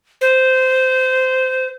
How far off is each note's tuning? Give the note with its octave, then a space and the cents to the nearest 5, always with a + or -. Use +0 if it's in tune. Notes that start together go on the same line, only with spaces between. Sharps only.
C5 -15